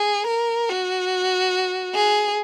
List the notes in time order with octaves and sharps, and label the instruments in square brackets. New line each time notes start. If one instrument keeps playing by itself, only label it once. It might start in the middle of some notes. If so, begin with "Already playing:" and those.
Already playing: [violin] G#4
A#4
F#4
G#4